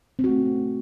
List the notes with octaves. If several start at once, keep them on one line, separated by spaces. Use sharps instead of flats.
C4
F#4
A3